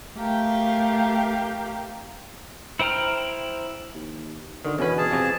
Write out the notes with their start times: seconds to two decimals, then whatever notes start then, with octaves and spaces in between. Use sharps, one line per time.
0.18 A3 G4 A#4 F5 G5
2.79 E4 C5 G5 A#5 F6
3.94 D#2
4.65 D3 D#3
4.79 E2 B2 C#4 B4
4.98 G#4 A5
5.11 F2 C3